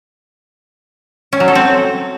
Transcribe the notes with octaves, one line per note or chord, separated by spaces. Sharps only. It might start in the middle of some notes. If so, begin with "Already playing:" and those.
C#4
F#3
A4
C4